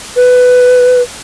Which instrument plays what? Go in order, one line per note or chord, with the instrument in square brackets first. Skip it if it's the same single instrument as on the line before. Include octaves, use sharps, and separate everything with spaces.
[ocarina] B4